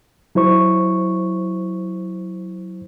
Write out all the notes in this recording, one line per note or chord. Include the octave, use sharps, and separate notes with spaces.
F#3 E4 C5 C#6